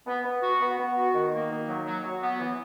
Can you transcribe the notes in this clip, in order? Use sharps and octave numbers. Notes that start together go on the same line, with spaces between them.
B3
B3
F#4
B3
B3
F#4
D#3
A#3
D#3
F#3
F#3
F#3
B3
E3